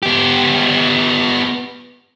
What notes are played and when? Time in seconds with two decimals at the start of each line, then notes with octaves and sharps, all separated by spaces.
0.03 B3 G4